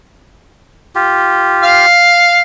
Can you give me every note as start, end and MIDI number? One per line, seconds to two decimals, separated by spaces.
0.95 1.86 65
0.95 1.86 67
1.62 2.42 77